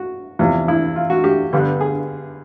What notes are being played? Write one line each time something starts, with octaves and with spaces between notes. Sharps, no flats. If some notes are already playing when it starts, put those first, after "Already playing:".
Already playing: F#4
E2 C3 F3
E4
F4
F#4
G4
G2 D3 G3 B3
G#4